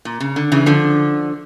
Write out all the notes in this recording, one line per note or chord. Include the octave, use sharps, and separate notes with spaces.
A#2
C#3
D3
C#3 E3
D3 F3